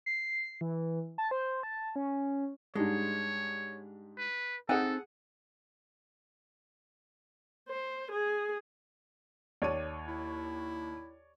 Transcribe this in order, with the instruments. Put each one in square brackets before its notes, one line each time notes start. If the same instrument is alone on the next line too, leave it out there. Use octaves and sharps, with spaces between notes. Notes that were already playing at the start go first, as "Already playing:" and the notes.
[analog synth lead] C7
E3
A5
C5
A5
C#4
[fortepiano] G#2 G3 D4 [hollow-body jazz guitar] G#3 [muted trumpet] C#5
[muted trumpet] B4
[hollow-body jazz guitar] C4 D#4 D#5 [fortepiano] G#4 F#5 [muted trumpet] A4
[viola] C5
G#4
[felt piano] D#2 A5 D#7 [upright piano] C#5 D5
[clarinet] E4